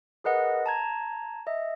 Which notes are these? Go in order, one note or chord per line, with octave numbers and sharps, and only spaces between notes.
G#4 A#4 B4 D#5 F#5
A5 A#5 G#6
D#5 E5